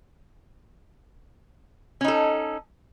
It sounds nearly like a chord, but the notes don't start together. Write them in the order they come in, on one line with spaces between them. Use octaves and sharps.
C#4 D#4 A4